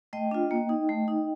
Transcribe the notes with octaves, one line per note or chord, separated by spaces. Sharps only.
A3 D#5 G5
D4 F4
A#3
D#4
A3
D#4